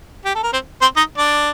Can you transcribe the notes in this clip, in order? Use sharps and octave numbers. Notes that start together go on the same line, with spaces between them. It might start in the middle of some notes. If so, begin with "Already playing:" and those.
G4
A4
A#4
C4 C5
C4 C5
D#4 D#5
D4 D5